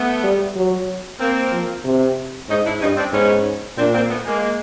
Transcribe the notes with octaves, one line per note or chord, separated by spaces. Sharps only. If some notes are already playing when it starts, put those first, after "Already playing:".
Already playing: A3 B3
G3
F#3
A#3 C4
F3
C3
G#2 C#4 D#4
D4 E4
G2 C#4 D#4
C4 D4
G#2 B3 C#4
A#2 C4 D4
A#3 C4
A3 B3
G#3 A#3